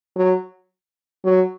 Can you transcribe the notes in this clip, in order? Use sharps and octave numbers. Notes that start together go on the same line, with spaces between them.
F#3
F#3